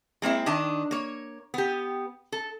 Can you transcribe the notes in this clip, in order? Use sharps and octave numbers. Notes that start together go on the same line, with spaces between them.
G#3 A#3 C4 E4
D#3 D4 D#5
A#3 C#5
B3 G4
A4